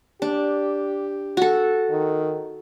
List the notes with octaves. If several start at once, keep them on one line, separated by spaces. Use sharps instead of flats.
D4 G4
F#4 A4
D#3